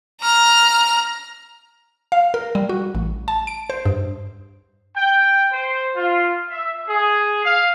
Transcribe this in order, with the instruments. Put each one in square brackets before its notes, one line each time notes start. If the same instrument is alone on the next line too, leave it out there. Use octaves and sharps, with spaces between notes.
[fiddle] A#5 F6
[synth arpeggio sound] F5
A#4
G3
F#4
A1
A5
D7
C5
G2
[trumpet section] G5
C5
F4
E5
G#4
F5